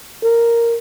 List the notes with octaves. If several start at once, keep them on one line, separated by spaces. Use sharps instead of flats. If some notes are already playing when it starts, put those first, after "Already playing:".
A#4